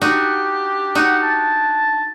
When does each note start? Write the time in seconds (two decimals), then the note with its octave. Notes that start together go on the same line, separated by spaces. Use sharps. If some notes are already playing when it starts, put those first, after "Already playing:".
0.02 D4 D#4 F#4 G4
0.95 D#4 F#4 F#5
1.23 A5